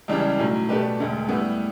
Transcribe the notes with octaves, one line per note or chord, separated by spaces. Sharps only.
C#2 C#3 E3 G3 D4
B1 A2 F#3
B2 A3 D4 G4 B4
E1 D2 D3
A2 G3 B3 E4